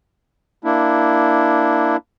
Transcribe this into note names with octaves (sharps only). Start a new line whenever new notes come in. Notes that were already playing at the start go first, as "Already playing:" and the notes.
A#3 D4 E4